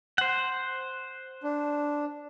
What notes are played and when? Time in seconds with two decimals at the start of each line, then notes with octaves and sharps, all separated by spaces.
0.18 C5 F#5
1.44 D4